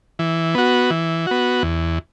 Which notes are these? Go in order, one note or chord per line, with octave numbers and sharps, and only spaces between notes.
E3
B3 F#4
E3
B3 F#4
E2